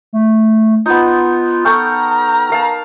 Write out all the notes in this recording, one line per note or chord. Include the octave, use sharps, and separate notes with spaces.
A3
B3 D#4 F4
A4 G5 A#5 C#6 F6
A#4 F5 A5